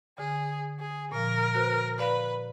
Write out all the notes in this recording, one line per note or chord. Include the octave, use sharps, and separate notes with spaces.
D3 G#4
G#4
A#2 F3 A#4
F#4 B4 C5
B4 D5 F5